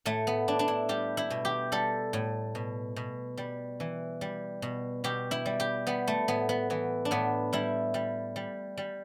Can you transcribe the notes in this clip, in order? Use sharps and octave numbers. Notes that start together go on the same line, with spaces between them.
A2 A3
B3
A2 D4
D4
E4
G3 G4
E4
B2
G4
G3 A4
A2
B2
B2
G3
E3
G3
B2
B2 G4
E4
G3
G4
G3 B3
A3
A2 B3
B3
E3 B3
D4
A2 B3
G3 E4
G3
G3
G3